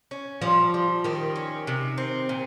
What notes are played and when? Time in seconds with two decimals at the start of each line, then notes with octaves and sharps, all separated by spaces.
0.11 C#4
0.42 F3 G3
0.74 G3
1.04 D#3 G4
1.36 C#4
1.67 C3
1.98 C4
2.29 A#2